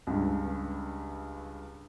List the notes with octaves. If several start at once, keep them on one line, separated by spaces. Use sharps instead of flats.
C#2 G2